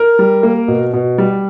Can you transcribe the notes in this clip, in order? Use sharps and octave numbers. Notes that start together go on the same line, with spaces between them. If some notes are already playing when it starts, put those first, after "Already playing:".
Already playing: A#4
G3
A#3
B2
B2
G3